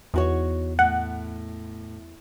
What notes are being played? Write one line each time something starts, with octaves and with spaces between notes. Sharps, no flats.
E2 D#4 F#4 C#5
A2 F#5